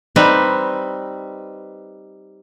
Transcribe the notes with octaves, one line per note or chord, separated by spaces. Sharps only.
G3 C4 D#4 B4